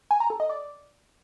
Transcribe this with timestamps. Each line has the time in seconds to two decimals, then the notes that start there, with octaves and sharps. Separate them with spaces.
0.11 G#5
0.20 A#5
0.30 A4
0.40 D#5
0.49 D5